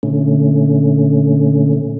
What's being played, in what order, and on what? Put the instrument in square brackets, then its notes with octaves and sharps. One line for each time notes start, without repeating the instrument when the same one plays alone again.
[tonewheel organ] A#2 D3 A3 C#4